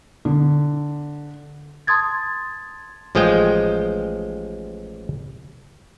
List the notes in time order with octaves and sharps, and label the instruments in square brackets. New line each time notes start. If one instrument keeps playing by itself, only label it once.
[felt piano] D3
[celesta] A5 C6 D#6 G#6 A6
[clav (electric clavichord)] A1 F3 G#3 D#5 G5